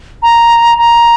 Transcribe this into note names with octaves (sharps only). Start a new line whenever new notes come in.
A#5
A#5